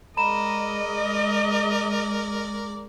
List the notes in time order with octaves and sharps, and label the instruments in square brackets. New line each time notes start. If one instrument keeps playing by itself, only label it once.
[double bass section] G#3 [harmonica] A#4 D5 [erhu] D#5 [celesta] A#5 B5 E7